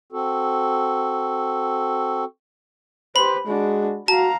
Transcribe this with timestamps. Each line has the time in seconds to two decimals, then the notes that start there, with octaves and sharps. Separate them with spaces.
0.12 C4 F#4 A4
3.16 G4 B4 C5 B5
3.46 G#3 D4 F#4
4.08 F#4 F5 A5 A#5